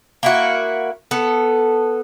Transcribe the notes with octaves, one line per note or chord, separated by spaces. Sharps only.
A#3 E4 F#4
B3 A4